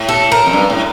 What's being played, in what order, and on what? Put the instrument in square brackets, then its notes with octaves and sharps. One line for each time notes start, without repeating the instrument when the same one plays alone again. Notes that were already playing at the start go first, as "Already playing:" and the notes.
Already playing: [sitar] A2
[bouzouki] A4
A#4
[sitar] F2
G2
A2